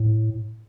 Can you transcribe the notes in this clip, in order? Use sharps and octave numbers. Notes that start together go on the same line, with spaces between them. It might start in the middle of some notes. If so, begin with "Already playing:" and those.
Already playing: A2